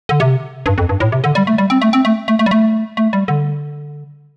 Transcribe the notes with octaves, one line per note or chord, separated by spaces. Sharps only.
D3
C3
G2
F2
G2
A2
C3
D3
G3
A3
G3
C4
A3
C4
A3
A3
A3
G3
A3
A3
G3
D3